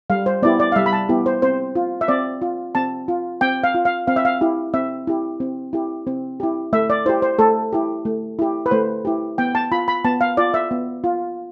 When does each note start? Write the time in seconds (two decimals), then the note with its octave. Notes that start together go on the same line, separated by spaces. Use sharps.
0.10 G3 F5
0.26 C5
0.42 B3 E4 G4 D5
0.60 D5
0.72 F5
0.76 G3 E5
0.86 B5
0.93 A5
1.09 B3 E4 G4
1.26 C5
1.42 C4 C5
1.75 F4
2.01 E5
2.08 C4 D5
2.42 F4
2.75 C4 A5
3.08 F4
3.41 C4 G5
3.64 F5
3.75 F4
3.85 F5
4.07 C4 F5
4.16 E5
4.25 F5
4.41 E4 G4
4.74 C4 E5
5.07 E4 G4
5.40 C4
5.73 E4 G4
6.07 C4
6.40 E4 G4
6.73 A3 E5
6.90 D5
7.06 E4 G4 C5
7.22 C5
7.39 A3 A4
7.73 E4 G4
8.05 A3
8.39 E4 G4
8.66 B4
8.71 A3 C5
9.05 E4 G4
9.38 B3 G5
9.55 A5
9.72 F4 B5
9.88 B5
10.05 B3 A5
10.21 F5
10.37 F4 D5
10.54 E5
10.71 B3
11.04 F4